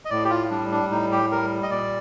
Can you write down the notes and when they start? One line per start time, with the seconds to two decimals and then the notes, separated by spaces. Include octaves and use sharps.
0.05 D#5
0.10 A2 D5
0.24 G4
0.30 F4
0.50 G3 D4
0.71 D4
0.91 A2 D#4
1.12 G4
1.31 G3 A#4
1.63 D#5
1.71 A#2 D5